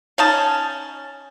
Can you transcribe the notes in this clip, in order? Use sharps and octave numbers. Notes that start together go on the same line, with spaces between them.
C#4 D#4 A5